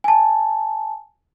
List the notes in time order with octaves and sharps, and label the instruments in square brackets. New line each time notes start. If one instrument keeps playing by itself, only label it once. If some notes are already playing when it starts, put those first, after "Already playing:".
[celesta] G#5 A5